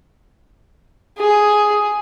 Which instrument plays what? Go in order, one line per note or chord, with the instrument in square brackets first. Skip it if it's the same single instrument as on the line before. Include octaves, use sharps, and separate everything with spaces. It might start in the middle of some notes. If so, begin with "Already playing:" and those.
[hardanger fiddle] G#4